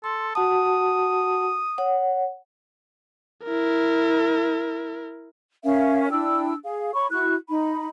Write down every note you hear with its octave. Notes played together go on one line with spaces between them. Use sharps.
A4 C6
F#4 F#5 A5 D#6
C#5 F#5
E4 A#4
C#4 A#4 E5 F5
D4 E4 G5 E6
G#4 F5
C#5 B5 C#6
E4 F#4 C#6 F#6
D#4 B5